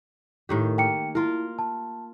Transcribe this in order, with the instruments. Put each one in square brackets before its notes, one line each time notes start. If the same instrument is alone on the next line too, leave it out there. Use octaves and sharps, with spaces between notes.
[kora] A2 D#3 G4
[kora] A#3 [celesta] G5 C#7
[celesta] E4 [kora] F4 A#4
[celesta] A5